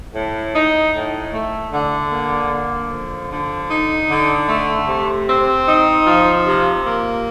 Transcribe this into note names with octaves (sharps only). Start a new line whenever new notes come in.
A2
D#4
A2
A3
D3
A#3
D3
F3
D3
D#4
D3
A3
C3
C4
D#4
F3
C3
A#3